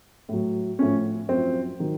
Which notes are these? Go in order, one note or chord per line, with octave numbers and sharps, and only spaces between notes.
A2 F#3
A2 F3 C#4
F#2 F3 C4
D#3 F#3